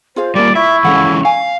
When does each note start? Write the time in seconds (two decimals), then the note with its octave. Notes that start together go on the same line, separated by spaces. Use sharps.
0.16 F4 G#4 C5 F5
0.35 G3 A#3 A#4 D5
0.55 E4 E5 C#6
0.85 E3 G#3 C#4 A4 F5 F#5
1.25 F5 G#5